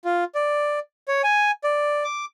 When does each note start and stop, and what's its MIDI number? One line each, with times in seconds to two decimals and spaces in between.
0.05 0.24 65
0.35 0.79 74
1.08 1.22 73
1.24 1.51 80
1.64 2.04 74
2.05 2.25 86